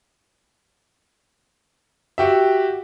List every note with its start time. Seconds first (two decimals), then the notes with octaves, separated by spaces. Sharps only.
2.18 F#4 G4 E5